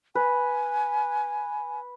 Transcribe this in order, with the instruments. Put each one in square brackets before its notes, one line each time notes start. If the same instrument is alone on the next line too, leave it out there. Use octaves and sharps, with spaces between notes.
[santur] B4 [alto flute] G#5